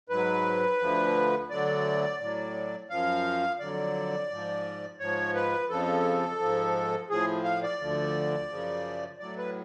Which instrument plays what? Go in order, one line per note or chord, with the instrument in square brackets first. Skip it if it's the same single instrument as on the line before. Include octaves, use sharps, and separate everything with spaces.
[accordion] G#2 F#3 B4
D2 D3 F3
D2 D3 F#3 D5
A2 F#3
F#2 F3 F5
F2 D3 F#3 D5
G#2 F3
G#2 F3 C#5
B4
F2 C#3 F3 A4
G#2 F3
A2 F3 G#4
F5
D5
D2 D3 F3
F#2 C#3 F3
A2 F#3 D5
B4